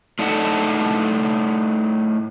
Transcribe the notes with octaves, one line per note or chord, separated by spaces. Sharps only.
A2 D4 D#4 A4 E5 F#5